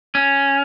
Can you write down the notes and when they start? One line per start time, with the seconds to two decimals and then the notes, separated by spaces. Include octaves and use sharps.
0.15 C#4